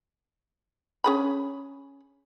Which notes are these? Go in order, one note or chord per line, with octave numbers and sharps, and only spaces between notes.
C#4 G#4 B5